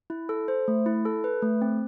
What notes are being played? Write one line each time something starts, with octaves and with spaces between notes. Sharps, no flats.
E4
A4
C5
A3
E4
A4
B4
A3
C4